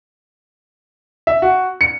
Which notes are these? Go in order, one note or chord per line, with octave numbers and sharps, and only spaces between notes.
E5
F#4
C#7